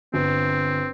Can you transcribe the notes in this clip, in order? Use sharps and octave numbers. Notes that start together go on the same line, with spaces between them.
G1 C4